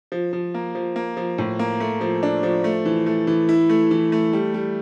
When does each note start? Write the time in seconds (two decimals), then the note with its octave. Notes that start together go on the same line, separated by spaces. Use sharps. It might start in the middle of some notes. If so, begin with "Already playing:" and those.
0.12 F3
0.33 F3
0.54 A#3
0.75 F3
0.96 A#3
1.17 F3
1.38 A2
1.59 A#3
1.80 A3
2.01 F3
2.23 D4
2.43 F3
2.64 A3
2.85 E3
3.06 A3
3.27 E3
3.49 E4
3.69 A3
3.91 E3
4.12 A3
4.33 G3
4.54 G3